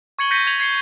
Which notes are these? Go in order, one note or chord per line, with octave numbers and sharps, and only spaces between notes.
C#6 G#6 C#7 F#7 G7
G6 A#6 B6 C#7 D#7 G7
G#6 B6 C#7 D#7 F7 F#7
G#6 C7 C#7 G7